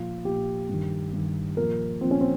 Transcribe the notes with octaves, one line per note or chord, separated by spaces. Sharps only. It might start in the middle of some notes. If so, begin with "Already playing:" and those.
Already playing: A#2 F3 F4
A#2 F3 G4
G2 D#3
G2 D#3
A#2 F3 A#4
A#2 F3 C4
C#4
C4